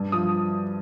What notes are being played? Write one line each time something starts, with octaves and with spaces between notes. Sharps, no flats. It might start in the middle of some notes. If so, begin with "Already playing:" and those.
Already playing: G2
F3 D#6